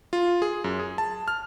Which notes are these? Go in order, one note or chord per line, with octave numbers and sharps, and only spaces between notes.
F4
G#4
F#2
G#4
A5
F6